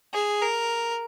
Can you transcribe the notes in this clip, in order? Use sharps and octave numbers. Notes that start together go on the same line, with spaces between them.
G#4
A#4